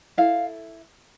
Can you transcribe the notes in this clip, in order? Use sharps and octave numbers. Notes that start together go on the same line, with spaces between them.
E4 A4 F5